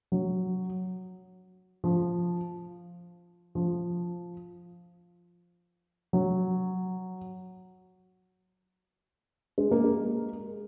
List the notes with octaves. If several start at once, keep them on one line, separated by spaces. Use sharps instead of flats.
F#3
F3
F3
F#3
G#3
A#3
G#3